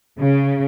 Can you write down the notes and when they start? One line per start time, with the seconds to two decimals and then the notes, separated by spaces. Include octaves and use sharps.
0.19 C#3